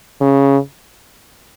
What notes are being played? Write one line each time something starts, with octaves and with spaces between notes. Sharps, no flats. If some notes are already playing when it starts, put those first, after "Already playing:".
C#3